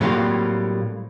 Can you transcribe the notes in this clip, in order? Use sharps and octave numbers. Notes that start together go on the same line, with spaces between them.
A2 F#3 G3 A#3 C4 F4